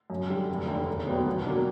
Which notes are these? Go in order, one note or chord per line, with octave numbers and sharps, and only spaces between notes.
F#2
D3 G3
F1
D#2 D3
E1
D#2 D3 F#3 B3
B2
F#3 A#3 D4